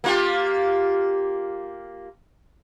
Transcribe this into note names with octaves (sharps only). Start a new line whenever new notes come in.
A#3 F4 G4